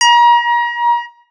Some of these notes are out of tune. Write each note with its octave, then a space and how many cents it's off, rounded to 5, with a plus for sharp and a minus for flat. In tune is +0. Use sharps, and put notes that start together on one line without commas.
A#5 +35